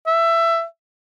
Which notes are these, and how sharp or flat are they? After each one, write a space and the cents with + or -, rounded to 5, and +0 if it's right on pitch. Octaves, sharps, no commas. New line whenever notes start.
E5 +15